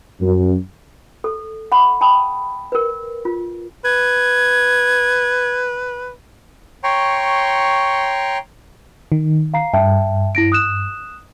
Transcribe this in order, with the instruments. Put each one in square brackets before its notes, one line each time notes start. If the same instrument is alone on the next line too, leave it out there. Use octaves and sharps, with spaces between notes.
[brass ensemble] F#2
[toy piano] A4
F#5 B5 D6
G5 A5 B5 D#6
A#4 B4
F4
[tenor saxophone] B4 [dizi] G#6
[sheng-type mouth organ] C#5 G5 A#5 C6 C#6
[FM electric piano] D#3
[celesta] F5 A#5 C7
[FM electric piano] G2 [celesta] E5 G5 A5
[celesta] E4 A#6 D7
D#6 F#6 E7